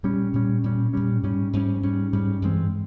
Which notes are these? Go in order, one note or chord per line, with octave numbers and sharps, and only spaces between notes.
A#2 G3 C#4
A#2 G3 C#4
A#2 G3 C#4
A#2 G3 C#4
G#2 G3 C#4
G#2 G3 C#4
G#2 G3 C#4
G#2 G3 C#4
G2 E3 G#3 C4